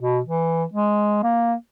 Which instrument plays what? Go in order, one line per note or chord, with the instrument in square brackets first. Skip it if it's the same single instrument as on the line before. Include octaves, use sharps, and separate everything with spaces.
[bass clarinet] B2
E3
G#3
A#3